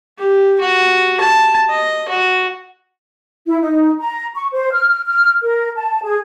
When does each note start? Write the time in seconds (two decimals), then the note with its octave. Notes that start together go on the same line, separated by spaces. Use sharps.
0.18 G4
0.61 F#4
1.20 A5
1.70 D#5
2.09 F#4
3.47 E4
3.61 D#4
4.00 A#5
4.35 C#6
4.53 C5
4.72 F6
5.07 F6
5.42 A#4
5.76 A5
6.03 G#4